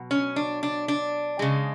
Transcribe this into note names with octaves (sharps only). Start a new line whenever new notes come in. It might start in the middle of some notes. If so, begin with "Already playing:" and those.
Already playing: B2 F#3
C#4
D4
D4
D4
C#3 G#3